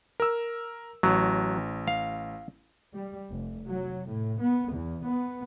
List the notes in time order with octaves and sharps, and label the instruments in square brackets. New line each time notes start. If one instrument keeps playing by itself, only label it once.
[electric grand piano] A#4 E6
[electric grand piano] A1 [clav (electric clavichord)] F#3
[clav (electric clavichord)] F5
[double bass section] G3
F1
F#3
A2
B3
E2
B3